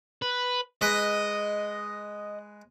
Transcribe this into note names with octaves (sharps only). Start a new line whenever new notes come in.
B4
G#3 B4 D#5